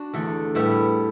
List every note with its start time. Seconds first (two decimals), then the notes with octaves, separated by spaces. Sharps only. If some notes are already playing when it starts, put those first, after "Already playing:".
Already playing: D4 F#4
0.13 E2 D3 A3
0.55 A2 G3 B3 E4